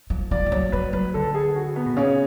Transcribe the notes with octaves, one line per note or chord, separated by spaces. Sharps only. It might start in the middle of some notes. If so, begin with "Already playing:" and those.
F3
F3 D5
F3
F#3 C#5
F#3 B4
F#3 B4
D3 A4
G#4
F#4
B3
B2
C#3 C#4